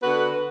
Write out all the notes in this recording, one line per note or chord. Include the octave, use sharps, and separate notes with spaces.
D3 B3 F#4 B4